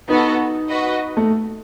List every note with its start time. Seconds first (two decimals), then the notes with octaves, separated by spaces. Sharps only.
0.09 B3 D#4 F#4 A4
0.69 F#4 B4 D#5
1.17 A3